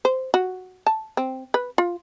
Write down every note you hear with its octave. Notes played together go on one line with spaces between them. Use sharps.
C5
F#4
A5
C4
B4
F4